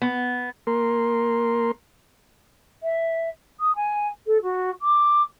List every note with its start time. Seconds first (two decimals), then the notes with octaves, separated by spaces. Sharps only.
0.02 B3
0.67 A#3 A#4 C6
2.83 E5
3.60 D#6
3.76 G#5
4.26 A4
4.42 F#4
4.82 D6